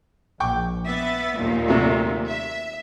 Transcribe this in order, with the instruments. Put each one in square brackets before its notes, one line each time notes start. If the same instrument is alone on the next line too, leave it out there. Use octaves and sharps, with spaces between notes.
[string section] A#1 [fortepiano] G5 C#6 D6
[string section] B3 E5 A6
D#2 A#2 D#3
[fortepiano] C3 F#3 A3
[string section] E5